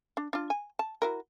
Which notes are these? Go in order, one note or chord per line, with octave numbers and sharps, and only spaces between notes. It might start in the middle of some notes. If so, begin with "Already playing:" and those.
D4
D4 F4
G#5
A5
E4 F#4 A#4